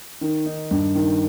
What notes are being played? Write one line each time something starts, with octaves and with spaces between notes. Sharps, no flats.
D#3
D#4
G2
D#3